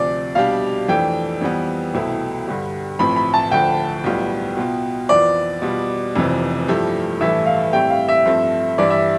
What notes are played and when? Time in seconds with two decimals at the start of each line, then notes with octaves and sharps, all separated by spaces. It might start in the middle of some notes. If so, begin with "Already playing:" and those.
Already playing: D2 C3 F3 D5
0.35 B2 G3 D4 G4 F5
0.88 F2 E3 A3 D4 G5
1.41 F2 E3 G3 B3
1.94 C2 B2 A3 E4
2.47 G2 D3 G3
2.99 A1 A2 F3 C4 B5
3.16 B5
3.34 A5
3.51 D2 D3 F3 G5
4.04 B1 A2 G3 B3 F4
4.57 B2 B3 F4
5.09 F2 E3 B3 F4 D5
5.62 B2 G3 B3 F4
6.15 F1 F2 C3 E3
6.68 G2 F3 A3 E4 G4
7.20 A1 G2 E3 A3 E5
7.46 F5
7.73 A2 G3 C4 G4 G5
7.90 F5
8.08 E5
8.25 G2 F3 A3 C4
8.78 G2 E3 G3 D5
8.90 E5